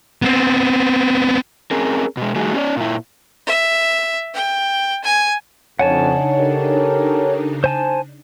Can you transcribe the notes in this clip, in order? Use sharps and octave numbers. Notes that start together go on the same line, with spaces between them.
B3 C4
C4 C#4 G#4 A#4
B2 G#3
D#3 G3 A3 D#4 F#4 G#4
C#4 F4 F#4 C#5 D5
A#2 E4
E5
G5
G#5
F2 C#3 D4 D#4 C#5 F#5 G#5 A5
G4 A4 A#4
C5 G#5 A5